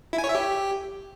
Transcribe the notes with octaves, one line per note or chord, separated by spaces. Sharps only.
E4
G#5
C#5
E5
G4